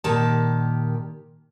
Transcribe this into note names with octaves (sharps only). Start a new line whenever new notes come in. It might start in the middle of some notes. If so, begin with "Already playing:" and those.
A#2 D#3 G4 A5